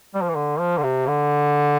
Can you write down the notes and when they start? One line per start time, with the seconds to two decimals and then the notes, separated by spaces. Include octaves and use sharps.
0.15 G3
0.22 F3
0.29 E3
0.35 D3
0.59 F3
0.78 D3
0.83 C3
1.07 D3